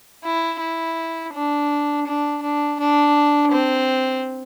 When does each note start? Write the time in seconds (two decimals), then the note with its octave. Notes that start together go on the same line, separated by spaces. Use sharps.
0.24 E4
0.60 E4
1.34 D4
2.07 D4
2.42 D4
2.80 D4
3.52 C4